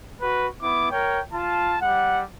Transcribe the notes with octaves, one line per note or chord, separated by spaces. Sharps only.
F#4 B4
B3 E4 D6
A#4 C#5 G5
F4 A5
G3 F#5